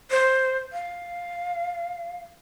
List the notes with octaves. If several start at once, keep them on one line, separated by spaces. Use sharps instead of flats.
C5
F5